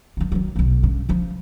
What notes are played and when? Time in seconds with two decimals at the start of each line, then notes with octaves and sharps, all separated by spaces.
0.17 D#3 F#3
0.32 D#3 F#3
0.56 B1 B3
0.83 G2 C#3
1.09 C#3 F3